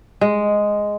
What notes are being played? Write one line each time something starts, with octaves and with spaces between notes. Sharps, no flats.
G#3